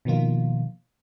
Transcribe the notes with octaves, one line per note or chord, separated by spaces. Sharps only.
B2 D#3 F3 A#3 F4